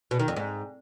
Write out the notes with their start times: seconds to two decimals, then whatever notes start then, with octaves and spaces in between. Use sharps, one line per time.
0.11 B2
0.19 D#3
0.28 F2
0.36 G#2